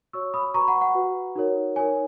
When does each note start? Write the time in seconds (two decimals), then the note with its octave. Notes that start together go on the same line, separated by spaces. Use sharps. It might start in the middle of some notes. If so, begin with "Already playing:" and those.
0.13 F#4 C#5 C#6 E6
0.34 B5 D#6
0.54 F#4 B4 A#5 C#6
0.61 B5
0.68 F#5 A#5
0.81 F#5 A#5
0.95 F#4 B4
1.35 D#4 F#4 A#4 C#5
1.76 D#4 A#4 C#5 G#5